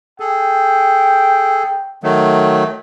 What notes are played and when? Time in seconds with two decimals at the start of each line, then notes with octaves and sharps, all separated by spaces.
0.20 G#4 A4 G5
2.03 D#3 F#3 A3